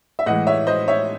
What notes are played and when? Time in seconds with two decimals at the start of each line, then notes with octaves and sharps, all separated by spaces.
0.19 E5
0.26 A2 E3 G#3 D#5 F#5
0.47 C#5 E5
0.67 C5 D#5
0.88 C#5 E5